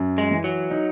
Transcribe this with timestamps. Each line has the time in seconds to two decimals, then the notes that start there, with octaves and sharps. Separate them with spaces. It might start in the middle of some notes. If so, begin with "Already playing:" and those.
Already playing: F#2
0.18 G#3
0.31 E3
0.44 F#3
0.71 D#4